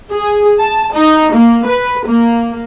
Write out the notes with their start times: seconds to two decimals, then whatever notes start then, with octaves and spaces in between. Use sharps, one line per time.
0.10 G#4
0.59 A5
0.92 D#4
1.33 A#3
1.65 B4
2.06 A#3